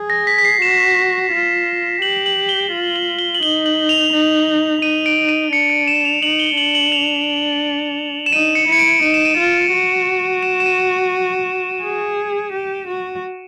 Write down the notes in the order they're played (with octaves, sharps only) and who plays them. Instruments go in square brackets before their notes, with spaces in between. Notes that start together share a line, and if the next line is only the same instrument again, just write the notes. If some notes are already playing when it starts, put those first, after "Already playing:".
Already playing: [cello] G#4
[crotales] A#6
B6
B6
C7
[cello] F#4 [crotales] E7
[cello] F4
[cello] G4 [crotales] F#7
[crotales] F#7
G7
[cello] F4
[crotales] F#7
G7
F#7
[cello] D#4 [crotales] G7
[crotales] F#7
F7
[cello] D#4
[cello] D#4 [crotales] D#7
[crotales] D7
D#7
[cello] D4 [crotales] C#7
[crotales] D7
E7
F7
[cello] D#4 [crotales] F#7
[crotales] G7
[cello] D4 [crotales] F#7
[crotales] F#7
F7
E7
[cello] D#4 [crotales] D#7
[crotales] C#7
[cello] E4 [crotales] C#7
[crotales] D7
[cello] D#4 [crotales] D#7
[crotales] E7
D#7
[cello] F4
F#4
[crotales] E7
E7
D#7
[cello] G#4
G4
F#4